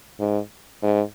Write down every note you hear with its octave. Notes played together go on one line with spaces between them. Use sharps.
G#2
G#2